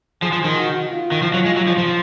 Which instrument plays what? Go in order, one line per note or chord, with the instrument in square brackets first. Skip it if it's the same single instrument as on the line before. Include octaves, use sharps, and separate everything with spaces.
[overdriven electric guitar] F3 [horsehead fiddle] G#4
[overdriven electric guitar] F3
D#3
[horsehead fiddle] F#4
F4
[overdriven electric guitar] D#3
[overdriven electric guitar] F3 [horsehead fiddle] F4
[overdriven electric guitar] F#3
G#3
F#3
F3
F3